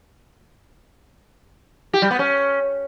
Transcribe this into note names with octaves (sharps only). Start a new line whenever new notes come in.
G4
G3
B3
C#4